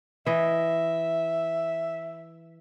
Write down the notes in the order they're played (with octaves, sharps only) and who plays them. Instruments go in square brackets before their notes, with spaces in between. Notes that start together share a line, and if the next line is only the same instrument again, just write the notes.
[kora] E3 D#5 [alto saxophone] E5